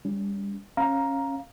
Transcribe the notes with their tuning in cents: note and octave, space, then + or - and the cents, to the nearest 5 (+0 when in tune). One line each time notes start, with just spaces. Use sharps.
G3 +30 C#4 +40
C#4 -20 F5 +0 A#5 +10